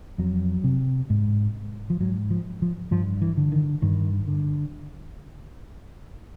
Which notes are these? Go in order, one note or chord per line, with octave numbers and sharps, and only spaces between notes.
F2 F#3
C3
G#2
F3
G#2 F#3
F3
F3
G2 F3
E3
D3
D#3
G2 D#3
D3